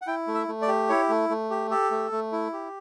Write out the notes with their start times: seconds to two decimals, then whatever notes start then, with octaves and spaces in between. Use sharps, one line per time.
0.02 F#5
0.07 E4 G5
0.27 A3
0.34 E5
0.48 A3
0.62 D5
0.68 G4
0.89 E4 C#5
1.09 A3
1.29 A3
1.50 G4
1.71 G4 A4
1.91 A3
2.12 A3
2.32 E4
2.53 G4